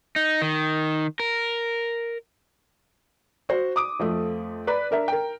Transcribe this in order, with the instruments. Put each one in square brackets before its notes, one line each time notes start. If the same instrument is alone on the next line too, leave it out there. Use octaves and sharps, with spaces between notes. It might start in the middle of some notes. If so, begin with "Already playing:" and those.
[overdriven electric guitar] D#4
D#3
A#4
[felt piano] F#4 C5
D6 D#6 D7
F2 F3 A3
B4 D5 B5
D4 A#4 E5
A#4 G5